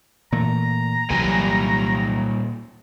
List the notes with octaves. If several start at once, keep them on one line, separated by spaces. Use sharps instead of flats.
A#2 E3 A3 A#5
C2 A#2 E3 F#3 G3 G#5